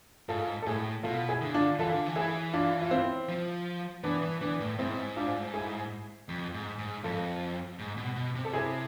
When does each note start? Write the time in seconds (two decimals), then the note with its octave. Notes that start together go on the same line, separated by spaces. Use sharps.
0.29 G#2 F4 A4
0.62 A4
0.66 A2 E4 G#4
1.03 B2 F4 A4
1.29 E4 G#4
1.41 D3
1.54 D4 F4
1.79 E3 F4 A4
1.92 D3
2.06 E3
2.16 E4 G#4
2.53 D4 F4
2.82 F4
2.91 C4 E4
3.29 F3
4.03 E3 B3 D4
4.23 E3
4.41 E3 B3 D4
4.60 A2
4.78 G#2 C4 E4
5.16 D4 F4
5.54 E4 G#4
6.29 F2
6.54 G#2
6.79 G#2
7.03 F2 F4 A4
7.79 G#2
7.97 B2
8.16 B2
8.35 C3
8.45 A4
8.53 E4 G#4